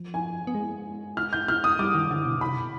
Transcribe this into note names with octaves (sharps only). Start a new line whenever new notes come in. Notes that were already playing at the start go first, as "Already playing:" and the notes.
Already playing: F3
G#5
B3
G#3
F6
G6
F6
D#6
G3 D6
D#3
D3
B2
C3 B5
B2